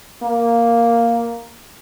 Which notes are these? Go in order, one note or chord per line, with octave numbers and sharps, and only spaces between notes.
A#3